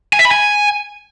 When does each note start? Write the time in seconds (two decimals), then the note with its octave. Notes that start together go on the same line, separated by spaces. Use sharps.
0.13 G#5
0.19 E5
0.25 B5
0.31 G#5